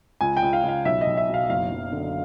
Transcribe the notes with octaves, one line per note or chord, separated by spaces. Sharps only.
C#2 G#5
G5
C#2
F5
C#2
F5
B1 E5
D#5
B1
E5
B2
F5
F#1 F5
F#1
D3